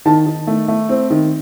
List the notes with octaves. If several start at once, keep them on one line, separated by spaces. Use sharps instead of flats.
D#3 A5
D#3
A3
A3
C4
D#3